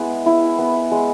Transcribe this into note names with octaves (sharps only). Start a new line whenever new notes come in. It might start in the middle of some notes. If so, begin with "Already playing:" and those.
Already playing: G#3 B3 E4
E4
B3
G#3